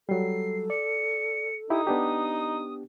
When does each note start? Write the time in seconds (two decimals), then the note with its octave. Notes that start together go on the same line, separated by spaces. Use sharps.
0.09 F#3 G3 A4 C7
0.70 D5 C#7
1.70 D#4 E4 G4 D#6
1.87 B3 D4 G4